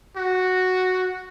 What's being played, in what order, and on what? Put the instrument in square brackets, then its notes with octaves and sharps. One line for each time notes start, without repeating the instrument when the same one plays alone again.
[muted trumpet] F#4